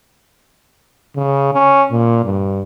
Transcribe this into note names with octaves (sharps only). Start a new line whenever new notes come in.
C#3
C#4
A#2
G2